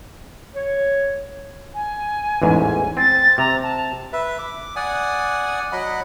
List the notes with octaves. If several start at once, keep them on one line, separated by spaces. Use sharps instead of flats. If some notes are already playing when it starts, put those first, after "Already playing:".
C#5
G#5
A1 E2 G#2
C4 A6
C3 A#5
A5
B4 E5
D6
D5 F#5 G#5 D#6
F#3 D#5 F#5 B5